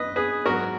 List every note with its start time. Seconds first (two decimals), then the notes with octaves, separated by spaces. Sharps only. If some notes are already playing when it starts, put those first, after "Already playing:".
Already playing: F#2 B4 D#5
0.16 G#4 B4
0.46 G#2 F#3 F#4 A#4